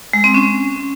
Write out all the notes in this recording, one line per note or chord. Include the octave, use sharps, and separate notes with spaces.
G#3
C4
C#4